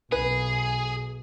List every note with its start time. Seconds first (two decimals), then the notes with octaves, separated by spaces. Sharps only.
0.12 B1 G#4 B4